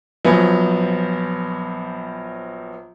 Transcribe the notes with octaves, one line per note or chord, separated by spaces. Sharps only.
A#1 F3 F#3 B3 G#5